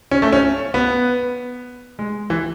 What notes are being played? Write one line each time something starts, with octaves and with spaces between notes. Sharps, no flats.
C#4
A3
C#4
B3
G#3
E3